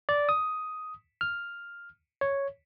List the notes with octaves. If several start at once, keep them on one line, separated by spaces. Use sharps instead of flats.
D5
D#6
F6
C#5